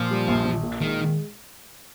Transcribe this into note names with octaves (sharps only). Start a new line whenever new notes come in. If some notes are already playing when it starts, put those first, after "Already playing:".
Already playing: A#2 F3
G3
A#1
A#1
A#2
D#3 G#3